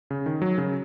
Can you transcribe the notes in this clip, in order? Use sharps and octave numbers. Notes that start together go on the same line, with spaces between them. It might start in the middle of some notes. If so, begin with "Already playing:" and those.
C#3
D#3
F#3
C#3